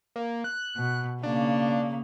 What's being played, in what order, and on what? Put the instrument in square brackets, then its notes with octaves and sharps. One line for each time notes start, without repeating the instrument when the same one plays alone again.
[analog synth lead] A#3
F#6
[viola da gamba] B2
[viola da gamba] C#3 A#3 [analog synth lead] D4